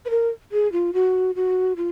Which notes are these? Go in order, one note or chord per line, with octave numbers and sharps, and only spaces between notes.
B4
A#4
G#4
F4
F#4
F#4
F4